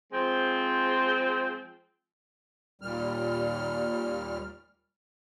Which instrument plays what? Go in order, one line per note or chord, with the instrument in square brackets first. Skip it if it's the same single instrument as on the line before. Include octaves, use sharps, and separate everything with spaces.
[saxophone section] F3 G#3 C4
[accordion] D#2 A#2 G3 F6